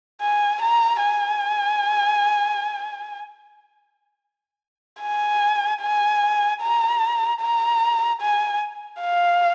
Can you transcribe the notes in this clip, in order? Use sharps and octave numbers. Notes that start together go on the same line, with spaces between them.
G#5
A#5
G#5
G#5
G#5
A#5
A#5
G#5
F5